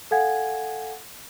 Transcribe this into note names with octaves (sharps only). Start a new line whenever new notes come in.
A4 F5 F#5 G#5 G#6